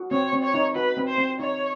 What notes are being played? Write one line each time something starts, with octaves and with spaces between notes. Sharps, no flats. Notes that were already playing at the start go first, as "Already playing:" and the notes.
Already playing: F#4
C4 C#5
C4
C#5
D#4
F#4 B4
C4
C5
C4
D#4 C#5